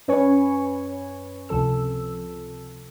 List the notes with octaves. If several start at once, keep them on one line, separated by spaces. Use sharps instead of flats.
F#2 C#4 B4 C#5 G#5 C#6
C#2 C3 F3 A4 E6